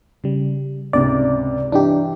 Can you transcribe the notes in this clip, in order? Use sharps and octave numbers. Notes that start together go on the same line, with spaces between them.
C#3 G3
C#2 G#2 C3 D5
G2 E3 D4 D#4 G4